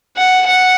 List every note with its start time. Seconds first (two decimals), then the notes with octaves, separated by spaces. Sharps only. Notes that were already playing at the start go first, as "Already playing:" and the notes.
0.17 F#5
0.47 F#5